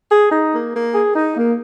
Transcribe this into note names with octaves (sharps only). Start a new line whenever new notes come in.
G#4
D#4
A#3
A#3
G#4
D#4
A#3